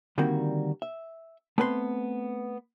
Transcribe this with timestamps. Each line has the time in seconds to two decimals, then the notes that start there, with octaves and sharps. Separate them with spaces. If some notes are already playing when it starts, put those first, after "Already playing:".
0.18 D3 D#3 G3 A#3 C4 F#4
0.82 E5
1.58 A3 B3 C4 B4 G#5 C6